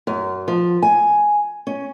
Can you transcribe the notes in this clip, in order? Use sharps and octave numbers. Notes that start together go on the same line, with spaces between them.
F#2
F3
G#5
C#4